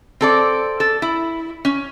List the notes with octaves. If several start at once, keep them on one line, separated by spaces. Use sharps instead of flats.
C4 A4 D5
A4
E4
C#4